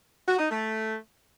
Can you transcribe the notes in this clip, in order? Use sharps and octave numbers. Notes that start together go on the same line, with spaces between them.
F#4
D#4
A3